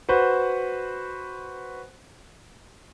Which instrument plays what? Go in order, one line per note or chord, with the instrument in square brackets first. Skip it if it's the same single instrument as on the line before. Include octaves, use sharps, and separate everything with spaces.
[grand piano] F#4 B4 C5